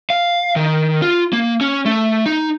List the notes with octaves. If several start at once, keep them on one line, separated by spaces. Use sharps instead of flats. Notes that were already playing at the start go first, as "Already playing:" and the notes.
F5
D#3
F4
A#3
C#4
A3
D#4